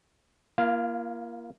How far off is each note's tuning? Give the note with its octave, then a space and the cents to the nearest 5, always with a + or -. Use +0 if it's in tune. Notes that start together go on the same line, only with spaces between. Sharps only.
A#3 +20 F4 -45 F5 +0